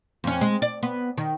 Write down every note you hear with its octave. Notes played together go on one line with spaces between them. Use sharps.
F2 C#4
G#3
D5
B3
D#3